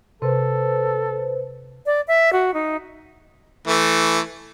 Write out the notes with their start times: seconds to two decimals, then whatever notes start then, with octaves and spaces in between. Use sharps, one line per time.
0.22 C3 A4 B4 C5
1.86 D5
2.08 E5
2.33 F#4
2.54 D#4
3.67 E3 A3